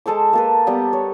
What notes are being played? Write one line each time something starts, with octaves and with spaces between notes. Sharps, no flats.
G#3 A4 C5 D6
A#3 A4 B4
G3 B3 D5 G5
C#5